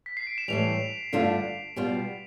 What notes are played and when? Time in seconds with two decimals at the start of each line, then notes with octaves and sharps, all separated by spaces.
0.06 B6
0.17 C7
0.27 D7
0.38 E7
0.48 A2 E3 G3 F7
1.13 G2 D3 A3 D4 F4
1.76 B2 G3 B3 F4